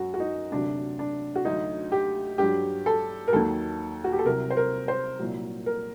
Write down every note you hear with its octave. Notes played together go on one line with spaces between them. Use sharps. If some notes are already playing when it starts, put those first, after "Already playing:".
Already playing: F#2 F#3 F#4
F#4
D#4
D2 C3 F#3 D4
D4
F#4
D2 D3 F#3 D#4
G4
G2 F#3 G4
A4
A#4
D#2 D#3 F#3 A4
F#4
G4
A4
C2 C3 F#3 A#4
C5
A#4
C5
C2 A#2 F#3
A#4